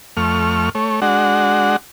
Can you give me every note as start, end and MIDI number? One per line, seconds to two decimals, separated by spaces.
0.17 0.69 41
0.17 0.69 57
0.17 0.69 85
0.17 0.69 89
0.75 1.00 57
0.75 1.00 73
1.02 1.76 56
1.02 1.76 62
1.02 1.76 66
1.02 1.76 78